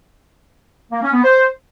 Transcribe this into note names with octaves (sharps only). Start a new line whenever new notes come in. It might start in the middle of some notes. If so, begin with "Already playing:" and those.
A#3
C#4
B3
C5